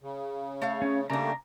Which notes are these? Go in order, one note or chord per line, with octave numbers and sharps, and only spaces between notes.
C#3
A3 C#5 F5
C#4
C#3 G3 A3 A#3 D4 A#5